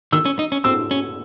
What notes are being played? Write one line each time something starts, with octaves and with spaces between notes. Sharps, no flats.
D#3 E6
C#4
D#4
C#4
C4 E6
C#4